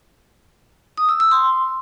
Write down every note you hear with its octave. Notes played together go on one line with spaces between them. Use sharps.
D#6
E6
E6
C6